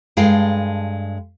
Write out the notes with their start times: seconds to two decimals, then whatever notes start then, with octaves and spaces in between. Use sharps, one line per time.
0.17 G2 G#3 A4 F5 G5